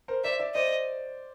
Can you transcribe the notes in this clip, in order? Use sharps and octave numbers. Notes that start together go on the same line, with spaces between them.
A#4 C5
C5 D5 E5
D5 E5
C5 D5 D#5